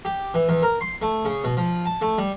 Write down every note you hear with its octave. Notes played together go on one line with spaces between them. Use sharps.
G4
E3
E2
A#4
C6
A3
C#3
B2
F3
A5
A3
G3